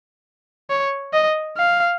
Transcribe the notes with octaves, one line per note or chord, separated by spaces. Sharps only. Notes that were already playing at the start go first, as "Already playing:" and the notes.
C#5
D#5
F5